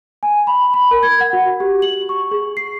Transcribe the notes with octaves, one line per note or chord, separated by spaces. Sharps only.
G#5
B5
B5
A#4
G#6
F#5
F#4
G4
F#7
C#6
G#4
C7